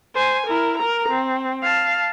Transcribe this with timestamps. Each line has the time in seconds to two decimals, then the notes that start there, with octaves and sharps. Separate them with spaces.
0.14 C5 G#5
0.47 E4 A#4
0.78 A#4 A#5
1.09 C4
1.62 F5 A5